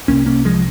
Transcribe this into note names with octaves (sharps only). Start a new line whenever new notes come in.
C2 C3 A#3 C#4
A#3 C#4
F3 G#3